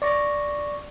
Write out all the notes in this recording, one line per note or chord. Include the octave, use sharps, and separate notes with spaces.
D5 C#6 A#6